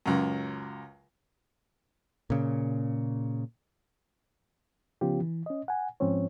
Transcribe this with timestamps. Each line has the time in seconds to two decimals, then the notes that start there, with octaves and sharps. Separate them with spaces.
0.06 C#2 F#2
2.30 A#2 C#3
5.01 C#3 F3 B3 C#4 F4 G4
5.21 E3
5.46 C#4 D#5
5.68 F#5 G#5
6.00 G#2 F3 C4 C#4 C#5